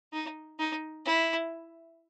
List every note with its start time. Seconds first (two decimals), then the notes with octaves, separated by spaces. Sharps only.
0.13 D#4
0.59 D#4
1.06 E4